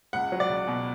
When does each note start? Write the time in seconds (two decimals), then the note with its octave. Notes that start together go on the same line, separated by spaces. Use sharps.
0.13 C#2 F#5
0.32 F#3
0.40 D5
0.49 C#2
0.67 B2